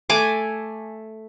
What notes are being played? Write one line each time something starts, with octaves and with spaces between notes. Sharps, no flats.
A3 G#5 D6